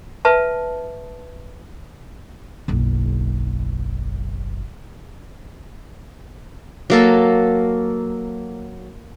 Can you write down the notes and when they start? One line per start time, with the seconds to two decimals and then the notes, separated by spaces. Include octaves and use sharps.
0.25 B4 E5 A5
2.68 F#1 B1
6.90 F#3 A#3 A4